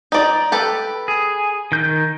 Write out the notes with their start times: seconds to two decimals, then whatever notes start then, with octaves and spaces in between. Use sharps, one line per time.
0.12 D#4 D5
0.52 G4 A4 B4
1.08 G#4
1.72 D#3 G6